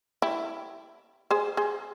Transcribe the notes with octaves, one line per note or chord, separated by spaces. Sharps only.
E4 G4
G#4 C5
G#4 C5